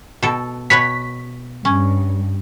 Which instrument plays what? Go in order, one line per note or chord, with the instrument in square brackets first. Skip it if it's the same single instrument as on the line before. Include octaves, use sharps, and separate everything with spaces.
[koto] B2 A4
[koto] B2 B4 C#5 [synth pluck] B6
[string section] G2 [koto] C#4